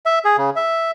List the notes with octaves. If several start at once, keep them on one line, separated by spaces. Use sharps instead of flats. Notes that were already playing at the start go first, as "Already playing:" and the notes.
E5
G#4
C#3
E5